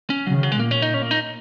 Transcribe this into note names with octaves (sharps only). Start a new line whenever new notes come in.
C#4
C#3 F#3
D#3
F#3
G#3
A#2 A#3
C#4
D#4
C#4
A#3
D#4